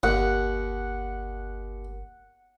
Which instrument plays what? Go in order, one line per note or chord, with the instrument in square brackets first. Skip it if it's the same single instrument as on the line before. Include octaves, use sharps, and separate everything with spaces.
[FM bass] G1 [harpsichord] D#2 [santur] F#5